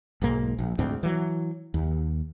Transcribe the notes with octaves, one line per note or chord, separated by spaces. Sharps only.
B1 G#2 A#3
A#1
D2 G#2 C4
E3 F#3
D#2